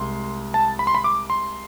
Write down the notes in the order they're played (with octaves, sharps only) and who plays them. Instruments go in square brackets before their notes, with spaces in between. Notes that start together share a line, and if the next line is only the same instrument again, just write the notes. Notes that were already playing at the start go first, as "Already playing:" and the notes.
Already playing: [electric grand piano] C2 G#3 C6
A5
B5
C6
B5
D6
C6